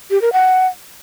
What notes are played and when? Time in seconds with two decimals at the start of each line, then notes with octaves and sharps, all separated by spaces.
0.11 G4
0.22 A#4
0.33 F#5